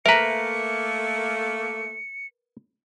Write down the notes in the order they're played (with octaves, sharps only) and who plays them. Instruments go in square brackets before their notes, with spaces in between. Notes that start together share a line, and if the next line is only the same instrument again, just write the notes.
[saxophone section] A3 A#3 [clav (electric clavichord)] A#4 B4 [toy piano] E5 A#5 [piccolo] C#7